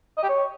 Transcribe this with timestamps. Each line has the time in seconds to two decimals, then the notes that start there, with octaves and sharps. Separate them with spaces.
0.17 D#5
0.23 G4
0.29 C#5